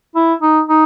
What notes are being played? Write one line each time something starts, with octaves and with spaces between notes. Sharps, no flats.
E4
D#4
D#4